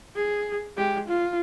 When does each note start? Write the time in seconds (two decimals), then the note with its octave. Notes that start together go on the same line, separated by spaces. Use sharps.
0.16 G#4
0.77 G#3 G4
1.08 F4